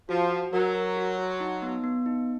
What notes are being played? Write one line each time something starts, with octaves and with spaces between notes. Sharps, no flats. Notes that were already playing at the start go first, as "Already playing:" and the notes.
F3 F#4
F#4
F#3 A#4
A#4
F#4
F#4
D#4
B3
B3
D#4